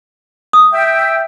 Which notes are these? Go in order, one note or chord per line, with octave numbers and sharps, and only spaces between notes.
D#6
E5 G5